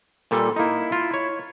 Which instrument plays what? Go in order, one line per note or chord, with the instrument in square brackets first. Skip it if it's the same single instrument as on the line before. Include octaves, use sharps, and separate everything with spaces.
[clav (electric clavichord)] A#2 G3 [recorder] A4
[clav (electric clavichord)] A#3 D#4 [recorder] E4
[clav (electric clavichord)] F4
C#5